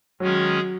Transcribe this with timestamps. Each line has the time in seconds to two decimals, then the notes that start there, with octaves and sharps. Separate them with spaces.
0.20 D#3 F#3 G#3 C#4 G#4